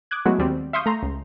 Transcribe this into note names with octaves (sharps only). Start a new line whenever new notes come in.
D6 D#6 F#6 G#6
F#3 G#3 A3 B3 E4 F#4
D#2 G3 C4
E5 F5 C6 C#6 D#6 G6
A3 A#5 C6
C#2